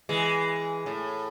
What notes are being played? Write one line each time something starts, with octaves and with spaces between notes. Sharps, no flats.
E3 G#3
A2